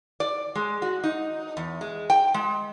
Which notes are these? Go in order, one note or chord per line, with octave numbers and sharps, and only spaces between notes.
D5
G#3
F#4
D#4
E2
G#3
G5
G#3